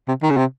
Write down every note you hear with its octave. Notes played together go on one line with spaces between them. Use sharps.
C3
D#3
C#3
C3